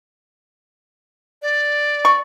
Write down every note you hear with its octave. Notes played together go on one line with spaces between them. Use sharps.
D5
C#6